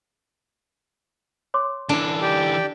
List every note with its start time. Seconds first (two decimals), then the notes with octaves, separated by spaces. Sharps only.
1.54 C#5 C6 D6
1.89 D3 E3 D4
2.22 G4 D5 G5